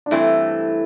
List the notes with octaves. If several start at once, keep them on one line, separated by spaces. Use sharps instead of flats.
D4
G2 E3 A3 C4 E4